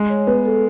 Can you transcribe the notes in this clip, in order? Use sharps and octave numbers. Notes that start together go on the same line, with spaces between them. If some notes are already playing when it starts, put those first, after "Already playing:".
Already playing: G#3
C#5
B3 B4
A4